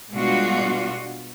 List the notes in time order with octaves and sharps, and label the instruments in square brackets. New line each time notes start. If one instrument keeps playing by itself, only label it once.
[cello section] B2 G3 G#3 D4 F4 F#4